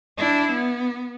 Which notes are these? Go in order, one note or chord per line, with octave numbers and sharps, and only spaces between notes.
D4 E4
B3